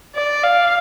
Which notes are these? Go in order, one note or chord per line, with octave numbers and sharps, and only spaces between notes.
D5
F5